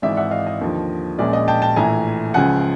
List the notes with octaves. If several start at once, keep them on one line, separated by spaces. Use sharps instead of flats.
G#1 G#2 E3 D5 E5
E5 F#5
D#5 F5
D#5
D#2 D3 F3
A#1 A#2 F3 G#3 C#4 D5
D#5
G5 A5
G5 A5
A#1 A2 E3 G#5 A#5
C#2 C#3 F3 F#5 G#5